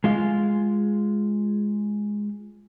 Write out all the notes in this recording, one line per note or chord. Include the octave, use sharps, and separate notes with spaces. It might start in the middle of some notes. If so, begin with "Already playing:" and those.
G#3 F4 F5